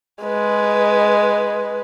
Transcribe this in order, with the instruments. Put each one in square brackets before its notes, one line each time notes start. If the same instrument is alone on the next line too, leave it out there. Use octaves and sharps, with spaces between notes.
[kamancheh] G#3 B4